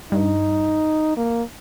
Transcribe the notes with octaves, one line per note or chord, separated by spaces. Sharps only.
G2 D#4
A#3